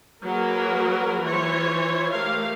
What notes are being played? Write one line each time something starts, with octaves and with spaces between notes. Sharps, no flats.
F#3 A#3 G#4 A#4 B4
E3 F4 C5 C#5
A3 G4 A#4 F5